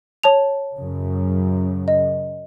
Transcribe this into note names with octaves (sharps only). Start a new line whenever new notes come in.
C#5 A5 F7
F#2 C#3
D#5